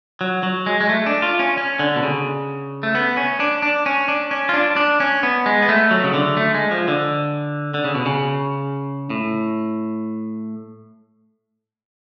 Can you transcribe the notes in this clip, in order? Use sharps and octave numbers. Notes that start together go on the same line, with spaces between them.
F#3
F#3
G#3
G#3
A3
D4
F4
C#4
C#4
D3
B2
C#3
A3
B3
C#4
D4
D4
C#4
D4
C#4
F4
D4
D4
C#4
B3
G#3
B3
A3
F#3
C#3
D3
A3
G#3
F3
D3
D3
C#3
B2
C#3
A2